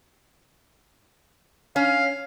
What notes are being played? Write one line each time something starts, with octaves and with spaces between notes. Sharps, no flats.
C#4 F5